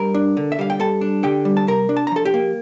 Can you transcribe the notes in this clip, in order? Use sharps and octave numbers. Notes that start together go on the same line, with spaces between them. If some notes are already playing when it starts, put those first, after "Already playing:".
Already playing: G2 A#4 A#5
D4
D3
E5
G3 F5
G5
G2 A4 A5
D4
D3 G4 G5
G3
A5
C3 A#4 A#5
D4
A5
A#5
F3 A4 A5
G4 G5
A#3